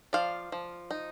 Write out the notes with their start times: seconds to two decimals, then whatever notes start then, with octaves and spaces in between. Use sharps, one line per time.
0.13 F3 D5 F5
0.52 F3
0.91 D#4